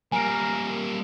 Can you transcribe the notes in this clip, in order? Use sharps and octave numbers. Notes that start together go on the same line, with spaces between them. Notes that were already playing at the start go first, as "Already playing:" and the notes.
G3 A#3 A#4 G#5 D7